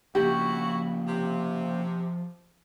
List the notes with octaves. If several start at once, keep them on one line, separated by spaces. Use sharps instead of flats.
C#3 F3 A#3 D4 E4 F#4 G4
C3